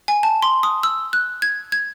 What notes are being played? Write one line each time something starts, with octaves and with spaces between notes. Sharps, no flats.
G#5
A5
C6
D#6
E6
F#6
G#6
G#6